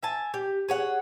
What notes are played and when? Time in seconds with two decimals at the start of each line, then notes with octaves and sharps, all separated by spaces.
0.03 E5 G#5 A5
0.34 G4
0.69 G#4 C#5 F#5